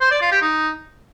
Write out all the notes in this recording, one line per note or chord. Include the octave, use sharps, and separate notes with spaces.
C5
D5
F4
G4
D#4